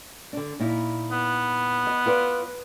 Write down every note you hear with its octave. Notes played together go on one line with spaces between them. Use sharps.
D3 D4
A#2 D#4 E4
B3
D#5
F4 B4 D5